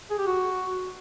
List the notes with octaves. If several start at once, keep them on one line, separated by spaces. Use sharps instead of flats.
G#4
G4
F#4